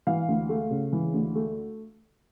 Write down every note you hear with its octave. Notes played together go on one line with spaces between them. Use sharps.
E3 F5
D2
A3
C#3
E3
D2
A3